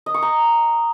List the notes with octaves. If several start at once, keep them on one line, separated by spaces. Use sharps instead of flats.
D#5
C#6
A#5